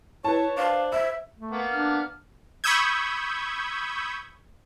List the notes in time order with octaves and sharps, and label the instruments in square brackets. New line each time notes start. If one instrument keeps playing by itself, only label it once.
[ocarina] E4 [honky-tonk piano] B4 A5 [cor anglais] C#5
[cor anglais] D4 [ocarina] C5 [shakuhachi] F5
[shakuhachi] E5 [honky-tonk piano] E6
[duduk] A3
[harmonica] A#3 B3
[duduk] D4 [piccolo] F6
[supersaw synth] B5 C#6 D#6 E6 G6 G#6